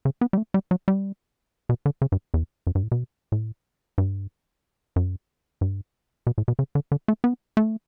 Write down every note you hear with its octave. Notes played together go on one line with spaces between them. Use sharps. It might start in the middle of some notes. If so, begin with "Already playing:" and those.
C#3
B3
G3
A3
G3
F#3
G3
B2
D3
C#3
G2
E2
F#2
G2
A2
B2
A2
G2
F#2
G2
B2
A2
B2
C#3
D3
D3
A3
B3
A3